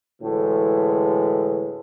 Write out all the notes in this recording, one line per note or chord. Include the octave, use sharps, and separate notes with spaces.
D2 A2 E3 G#3